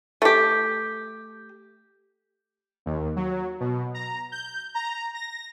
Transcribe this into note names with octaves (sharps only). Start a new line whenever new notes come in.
A3 G4
D#2
F#3
B2
A#5
G6
A#5
A#6